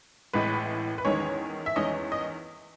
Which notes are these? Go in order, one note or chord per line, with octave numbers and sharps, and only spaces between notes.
A1 A2 G#3 B3 B4
B4
E2 D#3 G#3 C#4 C#5
E5
E2 D#3 G#3 C#4 D#5
D#5